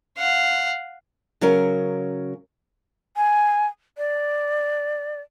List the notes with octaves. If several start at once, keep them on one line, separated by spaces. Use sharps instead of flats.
F5 F#5
C#3 F#3 C#4 A#4
G#5
D5